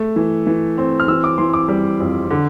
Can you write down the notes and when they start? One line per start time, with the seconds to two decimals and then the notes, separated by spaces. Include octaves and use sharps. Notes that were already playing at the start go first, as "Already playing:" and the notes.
Already playing: A3
0.16 E3
0.47 E3
0.78 C4
1.00 F6
1.08 E3 E6
1.24 D6
1.38 E3 C6
1.53 D6
1.68 G3
2.00 F2
2.31 D3